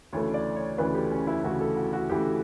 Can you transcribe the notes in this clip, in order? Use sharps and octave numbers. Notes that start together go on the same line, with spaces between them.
D2 C#3 E3 A3 C#5
D5
C#5
D2 C#3 E3 A3 B4
G4
C#4
E4
D2 C#3 E3 A3 F#4
A4
F#4
F#4
D2 C#3 E3 A3 G4